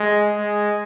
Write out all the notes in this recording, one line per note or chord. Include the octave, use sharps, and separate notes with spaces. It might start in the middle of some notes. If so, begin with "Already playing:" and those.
Already playing: G#3
G#3